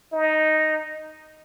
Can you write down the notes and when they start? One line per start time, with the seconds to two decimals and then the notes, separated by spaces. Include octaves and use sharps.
0.13 D#4